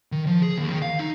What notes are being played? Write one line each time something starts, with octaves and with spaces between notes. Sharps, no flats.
D#3
F3
G#4
D#2
D#3
F5
D#4